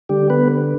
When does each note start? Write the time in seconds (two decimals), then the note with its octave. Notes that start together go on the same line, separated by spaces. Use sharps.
0.09 D3 G3 G4
0.30 B3 B4